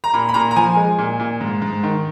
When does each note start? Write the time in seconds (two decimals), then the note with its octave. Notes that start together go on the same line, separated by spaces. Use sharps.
0.04 A#5
0.13 A#2 B5
0.29 B5
0.34 A#2 A#5
0.51 A#5
0.56 F3 G#5
0.76 G#3
0.98 A#2
1.19 A#2
1.41 G#2
1.62 G#2
1.83 D#3